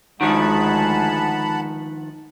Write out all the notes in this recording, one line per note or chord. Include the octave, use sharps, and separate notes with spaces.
D2 D#3 F3 G#3 G#4 F#5 A5 B5